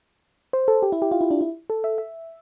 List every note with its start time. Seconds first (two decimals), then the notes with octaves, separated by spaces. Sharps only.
0.53 C5
0.68 A4
0.82 G4
0.92 E4
1.02 G4
1.11 F4
1.21 E4
1.31 D4
1.41 E4
1.70 A4
1.84 E5
1.98 E5